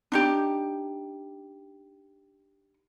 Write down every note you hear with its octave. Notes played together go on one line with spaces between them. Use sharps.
D4 D#4 G4